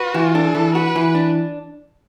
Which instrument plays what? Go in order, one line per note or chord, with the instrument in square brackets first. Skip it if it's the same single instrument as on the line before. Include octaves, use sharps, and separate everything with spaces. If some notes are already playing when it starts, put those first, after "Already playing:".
Already playing: [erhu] F#4 [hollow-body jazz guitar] B4
[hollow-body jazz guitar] E3
[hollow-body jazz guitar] D4 [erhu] A4
[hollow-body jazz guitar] E3
[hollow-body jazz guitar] F#4 [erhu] B4
[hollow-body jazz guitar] E3
D4